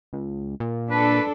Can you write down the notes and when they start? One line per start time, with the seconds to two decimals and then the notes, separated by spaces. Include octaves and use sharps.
0.13 C#2
0.60 A#2
0.91 D4 A4 B4